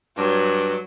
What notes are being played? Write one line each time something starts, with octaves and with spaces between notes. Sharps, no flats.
G2 F#3